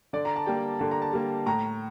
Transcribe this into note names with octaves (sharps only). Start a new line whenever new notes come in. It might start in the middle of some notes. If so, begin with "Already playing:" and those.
D3 D5
A#5
A5
G3 A#3 G5
D3 A5
A#5
A5
G3 A#3
A2 A#5